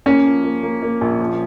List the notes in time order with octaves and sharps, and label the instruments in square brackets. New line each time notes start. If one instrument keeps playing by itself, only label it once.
[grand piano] A#3 [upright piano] C#4
[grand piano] F3
A#3
A#3
A#3
A#1
F3